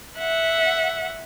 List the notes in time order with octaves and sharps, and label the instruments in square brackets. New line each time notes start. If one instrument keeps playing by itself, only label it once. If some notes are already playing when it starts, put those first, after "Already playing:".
[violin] E5 F#5